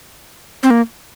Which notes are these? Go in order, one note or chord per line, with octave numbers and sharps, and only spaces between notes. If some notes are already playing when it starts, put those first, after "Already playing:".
C4
A#3